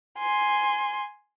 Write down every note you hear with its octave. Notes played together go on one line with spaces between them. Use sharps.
G#5 C6